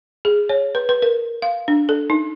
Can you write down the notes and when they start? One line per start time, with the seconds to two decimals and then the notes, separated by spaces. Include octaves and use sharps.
0.25 G#4
0.49 C#5
0.75 B4
0.89 B4
1.02 A#4
1.42 F5
1.68 D4
1.89 A4
2.10 D#4